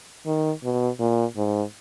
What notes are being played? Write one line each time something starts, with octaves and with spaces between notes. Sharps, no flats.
D#3
B2
A#2
G#2